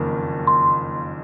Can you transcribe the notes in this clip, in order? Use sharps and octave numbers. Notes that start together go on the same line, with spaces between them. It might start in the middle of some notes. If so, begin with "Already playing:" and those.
Already playing: F#1 F2 D#3 A#3 F4
C6